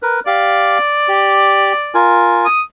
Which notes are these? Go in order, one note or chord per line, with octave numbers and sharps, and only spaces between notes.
A#4 B4
G4 D5 F5
G4
F4 A#4 G#5
D#6